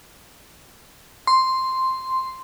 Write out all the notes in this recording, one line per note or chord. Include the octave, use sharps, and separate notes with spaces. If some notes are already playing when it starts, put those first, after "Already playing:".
C6